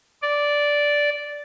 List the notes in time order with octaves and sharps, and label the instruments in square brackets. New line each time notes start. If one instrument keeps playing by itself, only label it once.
[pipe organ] D5